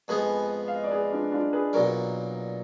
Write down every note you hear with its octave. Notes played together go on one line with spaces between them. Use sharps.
F2 F3 G#3 B3 G#4 B4
F5
D#5
D5
G#4 B4
D4 F4
D4 F4
G#4 B4
B1 A#2 F#3 A#4 D5